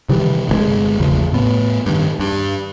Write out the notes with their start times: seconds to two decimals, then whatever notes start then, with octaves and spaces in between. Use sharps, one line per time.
0.09 C3 D#3 E3 G3
0.48 G1 B2 G#3
0.99 A1 E2 C#3 F3
1.33 A2 B3
1.86 G2 D#3
2.19 G2